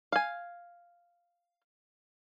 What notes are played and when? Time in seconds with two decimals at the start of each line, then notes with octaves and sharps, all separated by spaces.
0.12 F5 G#5